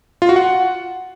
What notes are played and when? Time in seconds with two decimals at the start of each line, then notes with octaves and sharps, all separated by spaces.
0.22 F4
0.29 F#4
0.36 F#5